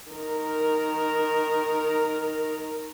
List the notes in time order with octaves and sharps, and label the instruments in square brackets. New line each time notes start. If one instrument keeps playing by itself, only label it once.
[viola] D#3 A#4